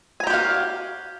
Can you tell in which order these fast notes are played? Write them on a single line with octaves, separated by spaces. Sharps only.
G#5 A#5 G4 F#4 F5